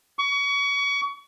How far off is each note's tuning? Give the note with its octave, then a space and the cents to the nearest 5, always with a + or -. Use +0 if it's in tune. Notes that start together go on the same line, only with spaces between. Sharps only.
C#6 +30